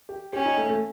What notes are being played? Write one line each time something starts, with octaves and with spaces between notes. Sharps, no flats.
G4
C#4 G4
D#4
A3
A3